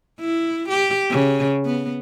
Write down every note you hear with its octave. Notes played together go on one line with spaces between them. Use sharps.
E4
G4
C#3
B3